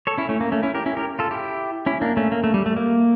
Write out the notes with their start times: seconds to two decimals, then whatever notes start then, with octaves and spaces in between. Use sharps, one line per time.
0.07 A4 C#5
0.18 C#4 E4
0.29 A3 C#4
0.41 A#3
0.52 A3 C#4
0.63 C#4 E4
0.75 G4 A#4
0.86 C#4 E4
0.97 G4 A#4
1.19 F4 A4
1.31 E4 G4
1.86 C#4 E4
2.02 A#3 D4
2.17 A3 C#4
2.32 A#3
2.44 A3
2.54 G3
2.66 A3
2.77 A#3